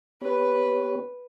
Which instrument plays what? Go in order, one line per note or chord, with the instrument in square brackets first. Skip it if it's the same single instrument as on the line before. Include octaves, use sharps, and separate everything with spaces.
[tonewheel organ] B3 G4 C#5 [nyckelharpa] B4